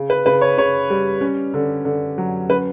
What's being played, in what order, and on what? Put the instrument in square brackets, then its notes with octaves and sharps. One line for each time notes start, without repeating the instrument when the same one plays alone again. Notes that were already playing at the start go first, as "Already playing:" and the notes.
Already playing: [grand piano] C#3
[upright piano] B4
[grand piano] C#3 [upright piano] B4
[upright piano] C#5
[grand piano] C#3 [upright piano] C#5
[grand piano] G3
C#4
D3
D3
F#3
[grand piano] C#4 [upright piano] B4